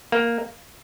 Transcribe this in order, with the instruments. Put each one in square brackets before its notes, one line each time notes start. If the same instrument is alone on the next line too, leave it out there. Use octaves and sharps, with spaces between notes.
[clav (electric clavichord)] A#3